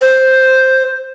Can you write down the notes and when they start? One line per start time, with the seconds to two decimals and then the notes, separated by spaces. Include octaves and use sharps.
0.01 C5